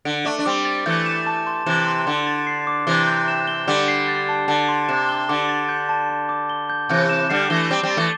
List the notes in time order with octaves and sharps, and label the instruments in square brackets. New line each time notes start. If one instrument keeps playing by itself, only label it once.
[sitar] D3 [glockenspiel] D7
[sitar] A3 D4 [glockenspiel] D6
[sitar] D4
[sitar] G3 C4 [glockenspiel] D6
[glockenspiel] A6
[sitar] E3 A3 [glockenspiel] G6
[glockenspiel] E7
A5
C6
[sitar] C3 E3 [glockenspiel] E7
[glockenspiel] C6
[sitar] D3 [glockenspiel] C6
[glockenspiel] A6
C7
D6
[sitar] C3 E3 [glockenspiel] D6
[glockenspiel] G6
E7
G7
[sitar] D3 G3 [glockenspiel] D6
[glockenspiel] C7
A6
A5
[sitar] D3 [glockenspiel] A5
[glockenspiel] C6
[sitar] C3 [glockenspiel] E7
[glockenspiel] G7
[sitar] D3 [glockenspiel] D6
[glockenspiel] A6
G6
A5
A5
D6
G7
G6
[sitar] C3 E3 [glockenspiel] G6
[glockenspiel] E7
[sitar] D3 G3 [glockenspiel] C7
[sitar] E3 A3 [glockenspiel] G7
[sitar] G3 C4 [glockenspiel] D6
[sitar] G3 C4
[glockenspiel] A6
[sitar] E3 A3